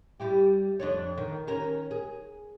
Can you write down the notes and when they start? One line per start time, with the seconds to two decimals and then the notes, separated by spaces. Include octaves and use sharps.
0.20 G3 E4 G4
0.80 F2 D4 C#5
1.18 D#3
1.47 D#3 C#4 A#4
1.91 G#4